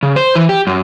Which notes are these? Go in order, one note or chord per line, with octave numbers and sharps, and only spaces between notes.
C#3
C5
E3
G4
F#2